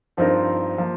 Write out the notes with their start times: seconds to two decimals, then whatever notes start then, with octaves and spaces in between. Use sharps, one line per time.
0.17 G2 F3 C4 D#4 A#4
0.78 F3 A#3